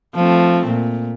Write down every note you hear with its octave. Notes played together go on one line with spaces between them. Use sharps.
F3 A3 C4
A#2